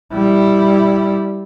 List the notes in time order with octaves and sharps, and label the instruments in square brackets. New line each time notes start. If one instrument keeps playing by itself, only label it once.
[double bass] G3 E4